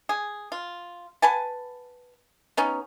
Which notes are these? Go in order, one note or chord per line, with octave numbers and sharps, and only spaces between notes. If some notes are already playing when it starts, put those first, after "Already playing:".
G#4
F4
B4 F#5 G#5 A5
B3 C#4 D#4